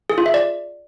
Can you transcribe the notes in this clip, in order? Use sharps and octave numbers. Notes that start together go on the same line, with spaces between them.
G#4
F4
E5
D5